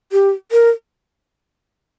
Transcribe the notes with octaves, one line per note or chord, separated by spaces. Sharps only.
G4
A#4